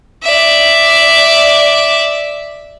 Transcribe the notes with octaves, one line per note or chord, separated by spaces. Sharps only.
D5 E5